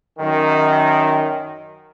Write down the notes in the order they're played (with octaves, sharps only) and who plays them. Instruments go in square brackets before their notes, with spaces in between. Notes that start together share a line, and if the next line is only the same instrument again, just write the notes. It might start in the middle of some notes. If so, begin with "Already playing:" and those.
[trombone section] F#2 D#3